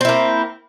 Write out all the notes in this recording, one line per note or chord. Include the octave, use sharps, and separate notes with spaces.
A#3 C4 E4